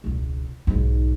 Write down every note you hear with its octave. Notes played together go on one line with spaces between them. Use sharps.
E1 C#2
B1 G#2